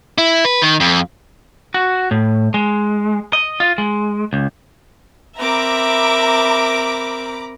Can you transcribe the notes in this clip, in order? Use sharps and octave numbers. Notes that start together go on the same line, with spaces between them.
E4
B4
D#3
F2
F#4
A2
G#3
D#5
F4
G#3
C#2
C4 A#4 E5 A#5 B5 D6